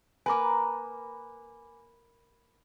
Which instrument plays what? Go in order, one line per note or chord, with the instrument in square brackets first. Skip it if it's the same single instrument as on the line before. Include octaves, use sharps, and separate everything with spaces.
[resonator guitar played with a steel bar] A#3 A#4 B4 [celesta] G#5 D6